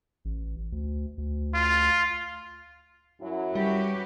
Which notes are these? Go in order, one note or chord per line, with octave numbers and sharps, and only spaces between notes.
A1
D2
D2
F4
F#2 F#3 E4
G3 F#4 G4 B4